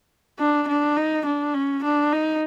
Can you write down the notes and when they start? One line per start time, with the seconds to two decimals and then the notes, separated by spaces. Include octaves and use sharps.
0.39 D4
0.68 D4
0.97 D#4
1.26 D4
1.54 C#4
1.84 D4
2.13 D#4